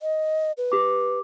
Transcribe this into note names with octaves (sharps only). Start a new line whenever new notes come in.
D#5
B4
G4 D6